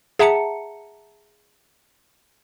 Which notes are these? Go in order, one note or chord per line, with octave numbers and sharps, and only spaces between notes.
G#4 E5 F#5 A5 A#5 C#7